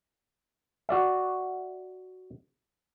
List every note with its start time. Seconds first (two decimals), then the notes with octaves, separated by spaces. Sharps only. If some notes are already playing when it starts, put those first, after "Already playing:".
0.89 F#4 D5 E5